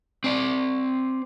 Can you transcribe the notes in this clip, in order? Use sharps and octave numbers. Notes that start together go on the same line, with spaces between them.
C4 D5